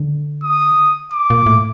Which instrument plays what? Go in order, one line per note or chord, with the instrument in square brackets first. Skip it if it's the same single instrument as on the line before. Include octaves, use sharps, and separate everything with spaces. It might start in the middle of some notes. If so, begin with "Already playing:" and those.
Already playing: [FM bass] D3
[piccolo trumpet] D#6
D6
[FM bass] A#2
A2